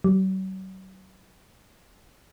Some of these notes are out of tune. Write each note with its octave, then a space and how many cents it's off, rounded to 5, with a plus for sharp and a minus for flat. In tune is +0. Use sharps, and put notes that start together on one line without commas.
F#3 +40